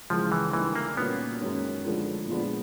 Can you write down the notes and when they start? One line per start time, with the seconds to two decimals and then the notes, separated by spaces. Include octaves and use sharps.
0.10 C#2 C#3 E3 F3 G#3
0.32 E3
0.53 D2 D3 E3 G3 A#3 D#4
0.75 A#3
0.97 A#2 G3 A#3 B3 C#4 F#4
1.41 F#2 D#3 G#3 C#4
1.85 D2 D3 F3 G#3
2.28 A#2 F3 G#3 B3 D4